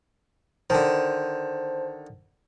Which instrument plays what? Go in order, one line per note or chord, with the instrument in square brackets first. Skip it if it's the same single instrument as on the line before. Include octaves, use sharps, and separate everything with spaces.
[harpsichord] D3 D#3 [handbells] C5 A5